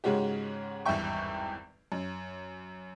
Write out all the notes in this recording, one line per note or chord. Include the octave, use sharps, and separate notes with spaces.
G#2 C#3 G#3 C#4 F#4 G4
G#1 E2 G2 E5 G5 C#6
F#2